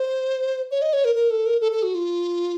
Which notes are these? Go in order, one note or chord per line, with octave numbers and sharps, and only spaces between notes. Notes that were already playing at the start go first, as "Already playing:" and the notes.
Already playing: C5
C#5
D#5
C#5
A#4
A#4
A4
A#4
A4
A4
F#4
F4